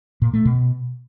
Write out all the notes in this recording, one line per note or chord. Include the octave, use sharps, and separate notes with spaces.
A#2
A3
B2